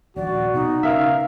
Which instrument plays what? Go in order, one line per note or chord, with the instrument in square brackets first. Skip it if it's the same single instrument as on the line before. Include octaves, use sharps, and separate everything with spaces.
[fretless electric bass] D#1 A#1 [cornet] F#4 [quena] D5
[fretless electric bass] B2 [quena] D#4
[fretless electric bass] C#3 B3 [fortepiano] A#4 E5 [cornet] F5